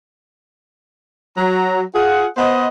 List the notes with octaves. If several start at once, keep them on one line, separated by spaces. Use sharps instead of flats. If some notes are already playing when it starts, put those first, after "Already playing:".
F#3 A#5
F4 G#4 F#5
B3 C5 D#5